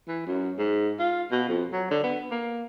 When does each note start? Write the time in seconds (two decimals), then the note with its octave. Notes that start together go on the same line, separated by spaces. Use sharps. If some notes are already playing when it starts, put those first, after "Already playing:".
0.08 E3
0.26 F#2
0.58 G#2
0.99 F4
1.31 B2
1.49 F2
1.72 F#3
1.91 D3
2.03 B3
2.31 A#3